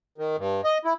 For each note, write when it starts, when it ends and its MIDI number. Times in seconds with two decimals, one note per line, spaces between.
0.18 0.36 51
0.38 0.61 43
0.64 0.78 75
0.85 0.93 64